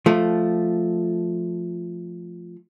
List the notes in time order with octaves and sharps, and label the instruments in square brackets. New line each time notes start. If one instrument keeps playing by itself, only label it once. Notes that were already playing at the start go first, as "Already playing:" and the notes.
[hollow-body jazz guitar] F3 A3